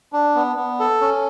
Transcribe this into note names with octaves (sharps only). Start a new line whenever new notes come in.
D4
B3
B3
A4
C#4